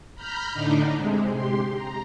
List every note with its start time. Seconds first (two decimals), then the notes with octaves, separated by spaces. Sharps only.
0.15 A#5 B5 F6 G6
0.53 A2 D3 D4 D#4
0.94 C3 G#3
1.32 G4 C6
1.73 A#5